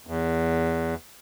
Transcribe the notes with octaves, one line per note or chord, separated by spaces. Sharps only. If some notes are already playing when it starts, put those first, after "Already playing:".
E2